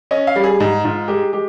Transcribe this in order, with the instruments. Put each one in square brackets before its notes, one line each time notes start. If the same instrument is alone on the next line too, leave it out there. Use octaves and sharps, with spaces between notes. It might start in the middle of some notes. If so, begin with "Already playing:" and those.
[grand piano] C#4 D#5
F5
G3
G#4
G#2
G#2 F4
G#3 G4
G#3 G4